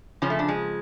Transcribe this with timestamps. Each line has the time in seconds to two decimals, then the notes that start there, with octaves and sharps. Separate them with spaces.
0.22 F2 C#3 F3 C#4
0.30 A3
0.39 D4
0.48 G#3